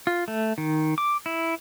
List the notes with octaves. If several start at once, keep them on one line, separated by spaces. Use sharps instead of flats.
F4
A3
D#3
D6
E4